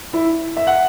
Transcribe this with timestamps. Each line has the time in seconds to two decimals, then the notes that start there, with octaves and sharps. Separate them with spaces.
0.13 E4
0.57 E5
0.67 F#5